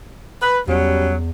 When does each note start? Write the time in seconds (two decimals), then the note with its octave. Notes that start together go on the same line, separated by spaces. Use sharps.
0.42 B4
0.68 E2 F#3 G3 C#4